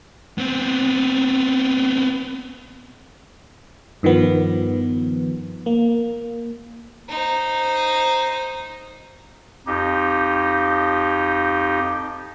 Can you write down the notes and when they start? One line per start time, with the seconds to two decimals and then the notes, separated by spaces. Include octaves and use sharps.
0.38 B3 C4
4.03 G2 D#3 F3 B3
5.66 A#3
7.09 D#4 C5
9.67 F2 D#4 G4